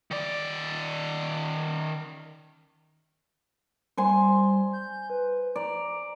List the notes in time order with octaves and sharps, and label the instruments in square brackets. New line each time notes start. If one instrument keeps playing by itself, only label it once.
[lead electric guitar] D#3 D5
[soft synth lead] G3 [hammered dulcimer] C5 G#5 C6
[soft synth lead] G6
B4
[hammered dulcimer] D5 [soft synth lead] A#5